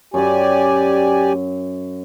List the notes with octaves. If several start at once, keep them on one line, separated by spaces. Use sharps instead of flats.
F#2 G4 D5 G#5 D6